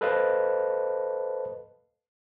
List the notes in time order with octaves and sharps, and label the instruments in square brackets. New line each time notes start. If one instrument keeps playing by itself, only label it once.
[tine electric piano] A4 B4 C5 D#5 F5 A5